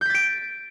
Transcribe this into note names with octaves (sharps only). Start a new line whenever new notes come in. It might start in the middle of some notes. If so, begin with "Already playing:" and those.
G6 A6 B6 D7